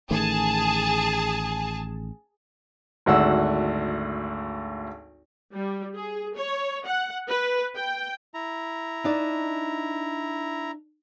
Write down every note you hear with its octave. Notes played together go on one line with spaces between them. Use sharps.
A1 D#3 A3 G#4 A5
G#1 D2 F#5 E6
G3
G#4
C#5
F#5
B4
G5
E4 A#5
D4 D#4 D5